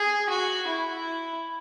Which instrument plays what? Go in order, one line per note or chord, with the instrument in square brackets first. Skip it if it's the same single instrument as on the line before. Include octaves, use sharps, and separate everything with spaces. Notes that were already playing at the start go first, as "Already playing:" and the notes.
Already playing: [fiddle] G#4
F#4
E4